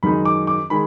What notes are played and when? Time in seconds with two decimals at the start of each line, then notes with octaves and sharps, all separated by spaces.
0.03 F#2 D#3 G#3 D#4 B5
0.25 D6
0.47 D6
0.70 D#3 G#3 B5